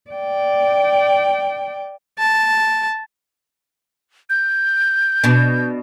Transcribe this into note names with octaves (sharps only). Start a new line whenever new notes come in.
D5 G5
A5
G6
B2 D4